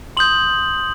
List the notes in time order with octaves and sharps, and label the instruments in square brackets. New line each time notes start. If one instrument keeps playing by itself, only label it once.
[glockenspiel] C6 D#6 G6 F#7